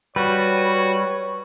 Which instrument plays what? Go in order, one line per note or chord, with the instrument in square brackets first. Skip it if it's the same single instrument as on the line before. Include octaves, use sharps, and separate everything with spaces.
[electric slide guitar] G3 [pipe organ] F#4 [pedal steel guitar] B4 [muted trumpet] C#5